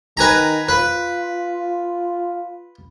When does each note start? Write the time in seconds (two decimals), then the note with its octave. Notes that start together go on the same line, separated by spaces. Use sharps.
0.17 D#3 B4 G#5 A#5
0.68 F4 B4